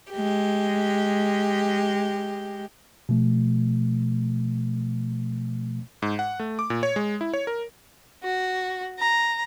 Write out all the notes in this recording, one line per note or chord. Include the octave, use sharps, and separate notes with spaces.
G#3 G4
B2 F3 A3
G#2
F#5
A3
D6
A#2
C#5
G#3
E4
C#5
A#4
F#4
A#5